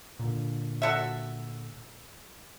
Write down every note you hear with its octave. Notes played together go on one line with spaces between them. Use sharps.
A#2 D3
F#4 A4 E5